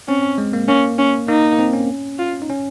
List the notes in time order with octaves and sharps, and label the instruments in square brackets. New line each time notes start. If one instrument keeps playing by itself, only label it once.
[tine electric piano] C4 [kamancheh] C#4
[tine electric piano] G#3
A#3
[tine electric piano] A#3 [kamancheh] C#4
[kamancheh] C#4
[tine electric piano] A#3 [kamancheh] D#4
[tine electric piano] A#3
C4
C#4
[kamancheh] F4
[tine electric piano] D#4
C#4